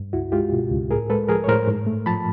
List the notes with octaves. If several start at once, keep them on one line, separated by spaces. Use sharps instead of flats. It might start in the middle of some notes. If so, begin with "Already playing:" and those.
Already playing: G2
C#2 E4 F#4
G#3 F4 G4
B2
C#2
A2 G#4 A#4
G#3 A4 B4
F3 G#4 A#4
C#5
A2 A#4 C5
G#2
A3
F3 A5 B5